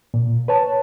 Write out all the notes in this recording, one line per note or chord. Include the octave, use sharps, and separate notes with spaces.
A#2
B4 C#5 A5